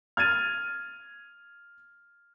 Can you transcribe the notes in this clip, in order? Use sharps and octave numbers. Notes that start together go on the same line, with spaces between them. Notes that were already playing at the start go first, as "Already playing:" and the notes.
F6 G#6 A6 D#7